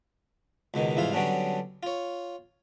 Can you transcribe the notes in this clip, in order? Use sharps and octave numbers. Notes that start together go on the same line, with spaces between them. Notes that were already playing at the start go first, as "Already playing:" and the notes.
C#2 B2 D#3 B3
C2 G#2 E3 E4 F4 F5
D3 F#3 G3 B3 C#4 D4
F4 C#5